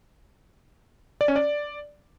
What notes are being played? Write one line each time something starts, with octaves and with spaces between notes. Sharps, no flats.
D5
C#4
D5